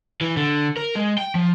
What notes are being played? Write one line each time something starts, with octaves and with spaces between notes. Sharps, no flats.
E3
D3
A#4
G#3
G5
F3